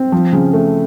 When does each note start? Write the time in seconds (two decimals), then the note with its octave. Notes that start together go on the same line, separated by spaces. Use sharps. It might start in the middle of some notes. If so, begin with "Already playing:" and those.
Already playing: C4
0.12 F3
0.33 C#3
0.53 A3